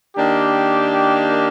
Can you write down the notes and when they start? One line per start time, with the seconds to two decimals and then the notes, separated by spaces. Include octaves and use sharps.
0.16 D#3 A#3 D4 G4